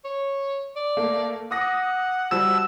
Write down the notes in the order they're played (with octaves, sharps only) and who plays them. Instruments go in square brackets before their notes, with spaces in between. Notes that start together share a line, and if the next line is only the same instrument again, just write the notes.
[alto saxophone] C#5
D5
[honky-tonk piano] A3 A#3
[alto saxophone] F#5 [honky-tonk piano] D6 D#6 A#6
[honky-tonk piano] F3 G3 [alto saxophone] F#4 [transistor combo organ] E6